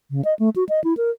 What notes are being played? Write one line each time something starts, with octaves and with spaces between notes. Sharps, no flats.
C#3
D#5
A3
F#4
D#5
E4
A#4